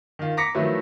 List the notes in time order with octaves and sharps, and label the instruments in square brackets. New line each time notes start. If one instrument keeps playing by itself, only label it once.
[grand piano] D#3 F4
A#5 D6 A#6 B6 C#7
D#3 F3 F#3 A3 E4 B4